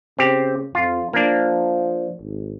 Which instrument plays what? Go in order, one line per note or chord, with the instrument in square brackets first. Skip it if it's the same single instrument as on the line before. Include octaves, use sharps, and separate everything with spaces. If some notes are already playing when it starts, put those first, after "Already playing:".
[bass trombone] C#3 [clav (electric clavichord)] C4 G4
[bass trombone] F2 [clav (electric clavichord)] F4
[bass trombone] F3 [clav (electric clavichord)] A#3 D4
[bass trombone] G#1